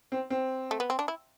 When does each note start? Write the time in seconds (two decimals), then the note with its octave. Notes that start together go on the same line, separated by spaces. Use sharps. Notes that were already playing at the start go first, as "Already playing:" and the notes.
0.12 C4
0.30 C4
0.71 A3
0.80 B3
0.90 C4
0.99 D4
1.08 E4